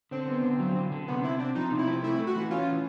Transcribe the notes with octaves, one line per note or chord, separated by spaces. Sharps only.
D3 C4
B3
D3
F#3
D3
D3
C3 B3
C4 E4
C4 D4
F3 D#4
C3
E4
C4
A3 E4
A3
F#4
E3
C#4 F4
E3